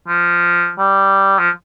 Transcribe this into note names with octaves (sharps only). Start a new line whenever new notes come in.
F3
G3
F3